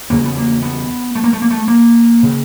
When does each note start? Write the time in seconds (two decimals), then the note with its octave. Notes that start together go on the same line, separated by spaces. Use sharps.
0.10 E2 C#3 A#3
0.24 B3
0.37 A#3
0.62 B3
1.15 A3
1.24 A#3
1.33 A3
1.42 A#3
1.50 A3
1.68 A#3
2.23 C#3